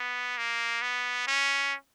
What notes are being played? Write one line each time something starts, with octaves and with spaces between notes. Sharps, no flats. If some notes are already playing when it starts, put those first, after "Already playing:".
Already playing: B3
A#3
B3
C#4